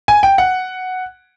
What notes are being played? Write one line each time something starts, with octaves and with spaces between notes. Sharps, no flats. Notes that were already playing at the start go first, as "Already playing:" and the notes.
G#5
G5
F#5